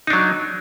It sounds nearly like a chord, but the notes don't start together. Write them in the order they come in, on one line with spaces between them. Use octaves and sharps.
D#4 D4 F#3